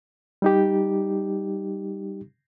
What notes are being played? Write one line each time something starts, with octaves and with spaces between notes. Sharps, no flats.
G3 D#4 G4